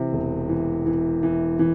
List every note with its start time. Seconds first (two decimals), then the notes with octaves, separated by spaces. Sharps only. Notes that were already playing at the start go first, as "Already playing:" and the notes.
Already playing: C3 E3
0.13 E1
0.49 E3
0.86 E3
1.23 E3
1.59 E3